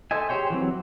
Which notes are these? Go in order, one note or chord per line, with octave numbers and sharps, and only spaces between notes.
A4 C5 D#5 E5 G#5
G4 G#4 C5 C#5 G5
E3 F#3 C4